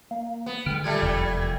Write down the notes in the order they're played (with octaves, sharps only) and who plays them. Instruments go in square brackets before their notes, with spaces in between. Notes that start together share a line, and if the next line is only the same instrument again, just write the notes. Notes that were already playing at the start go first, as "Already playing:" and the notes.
[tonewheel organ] A#3
[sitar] B3
[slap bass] D3 G#3 [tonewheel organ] G5 F6
[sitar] A#2 G3 A3 [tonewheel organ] G#6
[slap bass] F1 E2